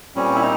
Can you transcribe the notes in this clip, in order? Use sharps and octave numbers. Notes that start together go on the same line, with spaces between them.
A#2 G3 C4 C#4
E4
D#4